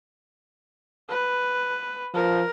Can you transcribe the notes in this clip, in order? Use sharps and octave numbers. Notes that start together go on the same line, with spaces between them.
B4
F3 A#4